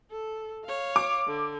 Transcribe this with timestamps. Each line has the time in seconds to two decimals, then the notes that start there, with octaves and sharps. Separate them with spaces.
0.11 A4
0.65 C#5 F5
0.96 D6
1.27 D3